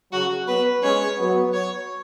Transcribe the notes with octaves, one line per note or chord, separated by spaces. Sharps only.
C#3 F#3 F#4
F#3 B3 B4
G#3 C#4 C#5
F#3 B3
C#5